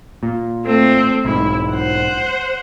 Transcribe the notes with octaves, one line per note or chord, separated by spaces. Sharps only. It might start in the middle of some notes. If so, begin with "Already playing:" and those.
A#2
A3 C4
B1 G#2 E4
C5 F#5